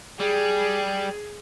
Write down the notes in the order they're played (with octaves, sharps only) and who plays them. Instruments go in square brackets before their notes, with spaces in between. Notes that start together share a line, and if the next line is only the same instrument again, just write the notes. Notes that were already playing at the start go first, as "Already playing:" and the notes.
[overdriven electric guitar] G3 [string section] G#4